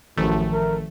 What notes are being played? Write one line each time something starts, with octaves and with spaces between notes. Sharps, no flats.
A1 F#2 D#3 F3 A3
A#4